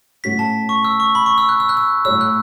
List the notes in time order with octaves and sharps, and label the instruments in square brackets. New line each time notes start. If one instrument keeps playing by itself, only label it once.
[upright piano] A2 A3 C#4 F#4 [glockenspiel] B6
[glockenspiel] A5
C#6
E6
C#6
B5
C#6
E6
F#6
E6
F#6
E6
[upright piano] A2 A3 F#4 C#5 [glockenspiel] E6
[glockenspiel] F#6